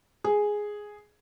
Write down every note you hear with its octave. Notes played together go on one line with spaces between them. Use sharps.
G#4